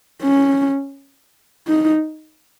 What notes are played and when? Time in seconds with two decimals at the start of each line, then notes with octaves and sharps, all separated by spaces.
0.23 C#4
1.67 D#4